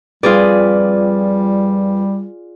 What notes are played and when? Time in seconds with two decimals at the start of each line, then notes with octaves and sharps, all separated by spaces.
0.23 F2 G3 F4 G#4 B4 D5